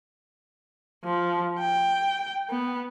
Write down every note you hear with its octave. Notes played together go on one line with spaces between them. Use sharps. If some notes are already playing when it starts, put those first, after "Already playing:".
F3
G5
B3